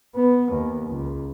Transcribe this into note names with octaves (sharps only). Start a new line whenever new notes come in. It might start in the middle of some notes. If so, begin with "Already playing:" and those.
B3
D#2
C#2